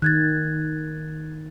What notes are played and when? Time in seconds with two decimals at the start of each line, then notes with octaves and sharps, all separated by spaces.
0.02 D#3 F#6 G#6 A6